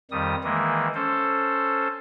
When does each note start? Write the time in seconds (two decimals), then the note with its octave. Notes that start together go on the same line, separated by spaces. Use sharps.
0.11 F2 D#3 G3 D#6
0.44 D#3 E3 G#3 A#3
0.94 C#4 A4 C5